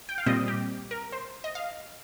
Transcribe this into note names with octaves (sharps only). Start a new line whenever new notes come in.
G5
F5
A#2 G3 C4 D#5
G4
A#4
C5
D#5
F5